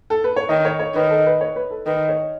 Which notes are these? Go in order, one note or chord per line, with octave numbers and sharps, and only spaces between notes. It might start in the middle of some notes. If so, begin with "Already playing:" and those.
A4
B4
C#5
D#3 D#5
C#5
C#5
D#3 B4
A4
B4
C#5
B4
A4
D#3 B4
C#5